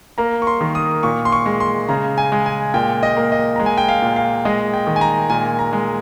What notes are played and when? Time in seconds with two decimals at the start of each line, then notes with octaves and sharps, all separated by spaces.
0.18 A#3 A#5
0.42 C#6
0.47 C6
0.61 D#3
0.75 D#6
1.03 A#2 C#6
1.25 C6
1.32 C#6
1.46 G#3
1.60 C6
1.89 C#3 A#5
2.18 G#5
2.32 G#3
2.46 G#5
2.74 A#2 G5
3.03 D#5
3.17 A#3
3.32 D#5
3.56 G#3 A#5
3.66 G#5
3.78 G5
3.89 F5
4.02 A#2
4.16 F5
4.45 G#3 D#5
4.74 G5
4.87 D#3
4.96 G#5
5.01 A#5
5.30 A#2 G#5
5.59 A#5
5.73 G#3